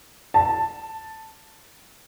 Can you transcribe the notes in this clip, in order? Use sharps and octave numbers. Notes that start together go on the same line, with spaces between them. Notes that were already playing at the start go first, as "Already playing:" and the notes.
A5